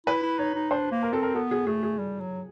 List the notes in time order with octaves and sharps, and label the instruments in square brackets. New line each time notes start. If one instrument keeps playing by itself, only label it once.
[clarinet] E4 [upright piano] B4
[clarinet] E4
[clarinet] D#4 [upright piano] C#5
[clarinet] D#4
[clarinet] D4 [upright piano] C5
[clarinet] A#3
[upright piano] A#4
[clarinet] C4 [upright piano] A4
[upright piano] A#4
[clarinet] B3 [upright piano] A4
[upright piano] G#4
[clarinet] A3 [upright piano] G#4
[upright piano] G#4
[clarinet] G3
F#3